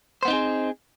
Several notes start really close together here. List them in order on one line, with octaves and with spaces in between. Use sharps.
C5 B3 D#4 C4 G#4